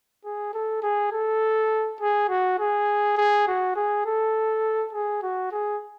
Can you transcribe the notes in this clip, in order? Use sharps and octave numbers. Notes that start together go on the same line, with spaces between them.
G#4
A4
G#4
A4
G#4
F#4
G#4
G#4
F#4
G#4
A4
G#4
F#4
G#4